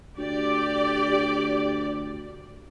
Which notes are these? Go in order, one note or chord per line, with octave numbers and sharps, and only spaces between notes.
D2 G4 D5